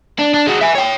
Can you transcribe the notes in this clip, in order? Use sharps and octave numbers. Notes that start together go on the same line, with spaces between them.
D4
D4
G#3 F#4
E5 G#5
C#5 G5